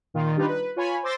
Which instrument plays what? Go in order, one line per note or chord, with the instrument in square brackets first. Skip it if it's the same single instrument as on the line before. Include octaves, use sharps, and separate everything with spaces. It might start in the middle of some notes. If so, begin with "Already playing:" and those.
[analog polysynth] A#2 D#3 F4
G3 D4 D#4 F4 B4
B4
F4 C#5 G#5 B5
C5 C6 D6 E6 A6 A#6